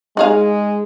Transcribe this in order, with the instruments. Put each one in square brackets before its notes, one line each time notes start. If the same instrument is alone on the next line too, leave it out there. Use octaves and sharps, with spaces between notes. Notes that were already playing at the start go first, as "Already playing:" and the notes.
[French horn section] G#3 [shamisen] D#4 G#4 F5